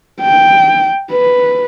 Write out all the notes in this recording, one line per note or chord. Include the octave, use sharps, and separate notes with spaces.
G5
B4